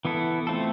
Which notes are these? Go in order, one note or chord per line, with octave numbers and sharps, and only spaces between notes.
E3 B3 E4 A4
A3 C4 F4 A4